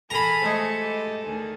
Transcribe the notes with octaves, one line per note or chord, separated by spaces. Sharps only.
E2 G#4 A4 A#5 B5 F6
G#3 A3 C5 C#6
G4 D#5
D2 D#3 G#4